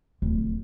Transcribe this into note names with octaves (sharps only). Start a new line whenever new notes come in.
D1